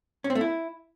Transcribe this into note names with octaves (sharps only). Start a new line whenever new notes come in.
C#4
C4
A3
E4